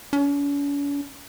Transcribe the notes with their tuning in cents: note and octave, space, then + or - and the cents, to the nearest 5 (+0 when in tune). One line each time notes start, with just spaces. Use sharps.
C#4 +45